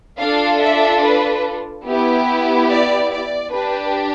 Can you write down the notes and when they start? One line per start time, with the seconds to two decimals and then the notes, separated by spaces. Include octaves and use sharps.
0.21 D4 F4 A4 F5
0.62 E5
1.04 B4
1.87 B3 E4 G4
2.70 D5
3.12 D5
3.53 D4 G4 B4